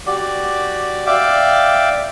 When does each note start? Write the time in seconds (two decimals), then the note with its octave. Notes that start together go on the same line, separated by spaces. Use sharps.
0.06 F#4 G4 D5
1.06 D5 E5 F5 G5 D6